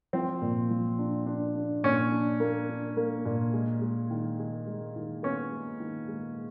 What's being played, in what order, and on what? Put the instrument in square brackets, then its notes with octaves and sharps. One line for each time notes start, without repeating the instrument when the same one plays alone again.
[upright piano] F3 [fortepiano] C4
[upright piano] A#2
F3
D4
D4
D4
[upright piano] A#2 [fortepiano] C#4
[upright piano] D4
A#3
D4
A#3
A#2
G#3
G#3
D#3
G#3
G#3
D#3
[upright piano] B3 [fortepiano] C#4
[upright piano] G#3
D#3
G#3